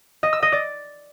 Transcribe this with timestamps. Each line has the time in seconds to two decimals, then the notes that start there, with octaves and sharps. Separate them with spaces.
0.23 D#5
0.33 E6
0.43 D#5
0.52 D5